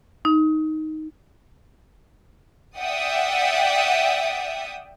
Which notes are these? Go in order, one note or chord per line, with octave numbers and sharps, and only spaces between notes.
D#4
D5 E5 F#5 G5 D#6